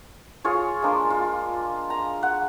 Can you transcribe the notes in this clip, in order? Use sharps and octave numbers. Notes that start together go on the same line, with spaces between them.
F4 G#4 C#5
G#3 A#3 D4
F4
A#5
F#5